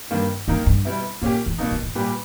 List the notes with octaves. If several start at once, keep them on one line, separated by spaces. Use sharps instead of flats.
G2 D#3 A#3
G2 D#3 A#3 D#4 A#4
G2
B2 G3 B3 E4
G2 A#2 A#3 C#4 G4
E2
G2 B2 A#3 D#4
G2
G#2
A#2 G3 B3 G4 B4